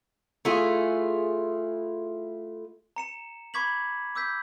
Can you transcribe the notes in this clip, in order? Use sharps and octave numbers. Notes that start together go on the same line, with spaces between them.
A3 E4 F4 G#4
A#5 C#7 E7
B5 C#6 D6 G#6 B6 F#7
D6 E6 G6 B6